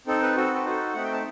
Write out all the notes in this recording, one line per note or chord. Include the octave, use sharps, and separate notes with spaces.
C4 D#4 A4
B4
C4 F#4 A4
B4
D#4 F#4 A4 C5
A3 C4 D#4 F#5
G5
A5